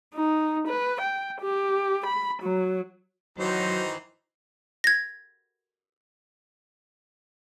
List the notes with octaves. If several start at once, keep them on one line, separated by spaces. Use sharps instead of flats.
D#4
B4
G5
G4
B5
F#3
D#3 E3 F#3 D#4 F#4 C5
G#6 A#6